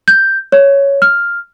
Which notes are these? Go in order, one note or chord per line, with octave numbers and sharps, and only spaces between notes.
G6
C#5
F6